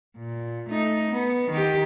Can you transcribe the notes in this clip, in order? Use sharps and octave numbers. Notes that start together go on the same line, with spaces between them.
A#2
A3 D#4
B3
D#3 G4